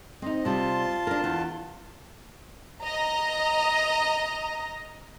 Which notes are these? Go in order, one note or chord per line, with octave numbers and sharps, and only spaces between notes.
C4 D#4 D#5
C3 G3 F4 A5
D4 A#4
E2
D#5 A#5